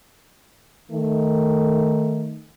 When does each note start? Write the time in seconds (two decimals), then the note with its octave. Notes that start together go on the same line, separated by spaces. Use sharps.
0.91 D#3 A3